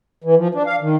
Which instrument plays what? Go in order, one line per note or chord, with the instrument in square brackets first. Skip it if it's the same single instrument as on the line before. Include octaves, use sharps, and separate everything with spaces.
[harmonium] E3
F3
D4
F5
D#3